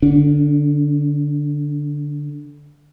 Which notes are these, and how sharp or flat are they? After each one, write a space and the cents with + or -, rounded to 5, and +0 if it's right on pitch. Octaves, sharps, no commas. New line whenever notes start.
D3 +0 D4 -45